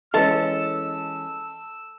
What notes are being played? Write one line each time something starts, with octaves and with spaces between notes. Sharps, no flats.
E3 G#3 C#4 A4 B4 D#5 E6